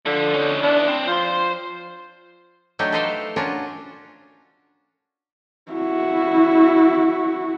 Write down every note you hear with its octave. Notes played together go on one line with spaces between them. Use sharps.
D3 F3
C#4 D#4
B3 D4 E4
C4
F3 C5 C6
F#3 A3 D4 D#4 G4 C#5
A4 B4 C5 D#5 F5 G5
C#4 D4 F4 F#4 A#4
E4 F#4